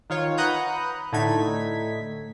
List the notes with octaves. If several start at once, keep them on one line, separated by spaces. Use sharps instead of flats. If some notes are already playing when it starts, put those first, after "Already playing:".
D#3 F4 C#5
B4 F#5 A#5 D#6 F#6 G6
A2 D3 A3 D#4 G#6 B6